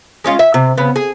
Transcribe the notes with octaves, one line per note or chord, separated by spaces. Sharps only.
G#3 C#4 F4
E5
C3
C#3 B3
G#4